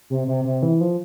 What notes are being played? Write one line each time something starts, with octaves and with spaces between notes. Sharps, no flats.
C3
C3
C3
E3
F3